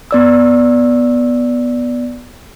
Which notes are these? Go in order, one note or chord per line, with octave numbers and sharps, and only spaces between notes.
B3 D5 E6